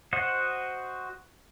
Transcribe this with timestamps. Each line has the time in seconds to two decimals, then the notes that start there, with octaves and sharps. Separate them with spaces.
0.13 F#4 C5 D#5 F#5